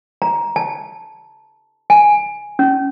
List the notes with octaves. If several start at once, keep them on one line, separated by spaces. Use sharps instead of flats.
A#5
A5
G#5
C#4